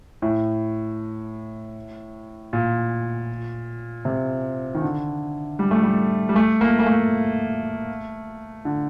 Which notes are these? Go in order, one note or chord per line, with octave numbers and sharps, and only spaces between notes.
A2
A#2
C3
D#3
D3
G3
A3
G3
G3
A3
A#3
A#3
A3
D3